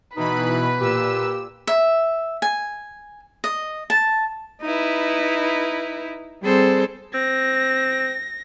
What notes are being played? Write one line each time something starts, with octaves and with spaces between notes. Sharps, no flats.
B2 E3 D#4 B4 B5
A#2 G4 E6 E7
E5
G#5
D#5
A5
D#4 E4 B4
G3 C4 G#4 A4 C5
C4 A#6